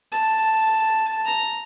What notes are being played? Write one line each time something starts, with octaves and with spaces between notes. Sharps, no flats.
A5
A#5